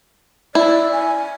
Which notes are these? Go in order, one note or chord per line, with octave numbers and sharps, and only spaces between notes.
E4 D5
G#5